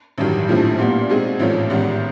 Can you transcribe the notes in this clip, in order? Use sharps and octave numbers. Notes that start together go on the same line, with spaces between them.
A1 G2 D#3 F#3
A#1 A2 F3 A3
A#2 G3 B3
B2 G#3 C4 D#4 G#4
A1 G#2 F3 A3 C#4
A1 G#2 D#3 G3 B3